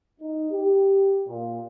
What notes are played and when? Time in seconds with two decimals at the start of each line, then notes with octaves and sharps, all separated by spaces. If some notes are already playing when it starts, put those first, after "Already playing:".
0.20 D#4
0.51 G4
1.27 A#2